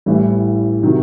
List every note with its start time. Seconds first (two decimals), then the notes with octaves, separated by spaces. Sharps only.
0.06 A1 A2 E3 G3
0.82 C3 D#3 F#3